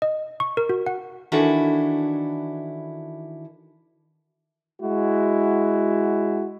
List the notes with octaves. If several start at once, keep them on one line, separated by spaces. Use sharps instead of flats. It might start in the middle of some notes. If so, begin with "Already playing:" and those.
D#5
C#6
A#4
F#4
F#5
D#3 E3 D4 E4 F#4 A4
G#3 E4 F#4